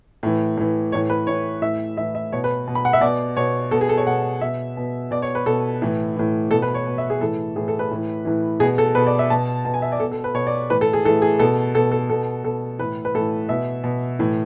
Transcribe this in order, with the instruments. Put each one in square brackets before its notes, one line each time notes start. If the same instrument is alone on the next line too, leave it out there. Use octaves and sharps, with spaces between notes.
[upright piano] A2 E3
A2 E3
A2 E3 C#5
B4
A2 E3 C#5
A2 E3 E5
A2 E3 E5
E5
B2 C#5
B4
B2
B5
F#5
E5
B2 D5
B2 C#5
B2 A4
G#4
A4
C#5
B2 F#5
B2 E5
B2
B2 D5
C#5
B4
B2 A4
A2 E3
A2 E3
B2 A4
B4
C#5
B2
E5
G#4
A2 E3 A4
A2 E3 G#4
A4
B4
A2 E3
A2 E3
B2 G#4
A4
B2 B4
D5
E5
B2 A5
B2 A5
G#5
E5
D5
B2 A4
A4
B4
B2 C#5
D5
A2 E3 B4
A4
G#4
E3 A4
A2
G#4
B2 A4
B2 A4
A4
B2 A4
B2 A4
A2 E3 B4
B4
A2 E3 A4
B2 E5
B2
A2 E3